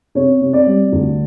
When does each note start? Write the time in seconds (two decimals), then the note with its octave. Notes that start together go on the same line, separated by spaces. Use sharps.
0.15 C3 C#5
0.41 C3
0.53 D5
0.66 G3
0.92 D2